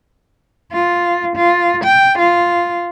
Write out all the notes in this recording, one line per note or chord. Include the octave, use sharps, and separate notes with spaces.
F4
F4
G5
F4